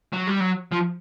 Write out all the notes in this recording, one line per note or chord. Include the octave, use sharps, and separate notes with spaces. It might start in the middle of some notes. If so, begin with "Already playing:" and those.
F#3
G3
F#3
F3